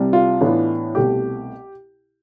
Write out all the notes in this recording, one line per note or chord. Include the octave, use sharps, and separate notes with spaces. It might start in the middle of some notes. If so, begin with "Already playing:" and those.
Already playing: C2 C3 G3
F4
A2 E3 B3 D4
C2 B2 A3 G4